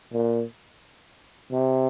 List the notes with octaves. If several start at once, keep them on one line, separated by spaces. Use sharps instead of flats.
A#2
C3